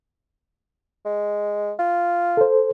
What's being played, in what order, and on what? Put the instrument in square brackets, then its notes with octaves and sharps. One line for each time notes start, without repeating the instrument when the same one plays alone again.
[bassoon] G#3
F4
[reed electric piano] A4 C5